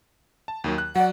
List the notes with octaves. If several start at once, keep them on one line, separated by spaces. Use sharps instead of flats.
A5
D#2 D#3 F#3
F#6
F#3 D5 F#5